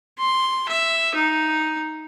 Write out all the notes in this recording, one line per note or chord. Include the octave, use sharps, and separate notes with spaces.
C6
E5
D#4